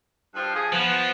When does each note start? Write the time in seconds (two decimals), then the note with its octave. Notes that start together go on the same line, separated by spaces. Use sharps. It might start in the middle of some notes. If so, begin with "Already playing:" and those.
0.35 G2 F3
0.54 F3 G#4
0.72 F3 B3